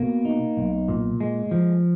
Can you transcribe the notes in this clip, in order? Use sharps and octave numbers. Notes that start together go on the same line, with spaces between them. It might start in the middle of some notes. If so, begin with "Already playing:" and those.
Already playing: B2 A#3
D#4
B1
A#2
G#3
F3